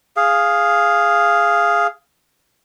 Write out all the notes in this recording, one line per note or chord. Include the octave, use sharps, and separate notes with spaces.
G#4 F5